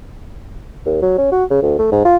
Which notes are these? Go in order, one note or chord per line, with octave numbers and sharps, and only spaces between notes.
D#2
F#3
C#4
F#4
C#3
D2
A3
G#2
F4